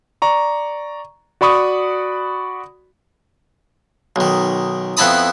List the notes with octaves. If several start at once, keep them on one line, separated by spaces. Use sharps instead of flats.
D5 A#5 C#6
F#4 D5 B5 C#6 D#6
B1 D#3
F2 B3 E4 A5 B5 D#6